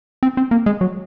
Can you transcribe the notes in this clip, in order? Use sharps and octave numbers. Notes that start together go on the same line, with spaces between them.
C4
C4
A#3
G#3
F#3